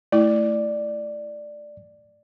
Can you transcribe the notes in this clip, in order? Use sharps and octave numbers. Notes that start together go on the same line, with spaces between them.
A3 E4 D5